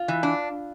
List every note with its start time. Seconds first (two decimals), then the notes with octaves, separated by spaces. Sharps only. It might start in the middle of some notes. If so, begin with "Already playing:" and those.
Already playing: F4
0.08 E3
0.23 D4